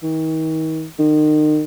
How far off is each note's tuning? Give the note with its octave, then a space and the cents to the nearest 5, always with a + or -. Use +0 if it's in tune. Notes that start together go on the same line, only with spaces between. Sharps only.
D#3 +40
D#3 -35